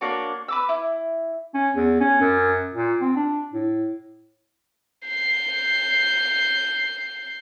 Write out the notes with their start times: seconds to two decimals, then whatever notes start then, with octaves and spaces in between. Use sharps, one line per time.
0.01 A#3 D4 F#4 C#5
0.48 B4 D6 E6
0.69 E4
1.54 C#4
1.75 E2
2.00 C#4
2.20 F#2
2.73 A#2
3.01 C4
3.16 D4
3.53 A2
5.07 G6 C7